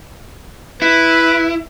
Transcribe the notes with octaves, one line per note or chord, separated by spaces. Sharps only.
E4 B4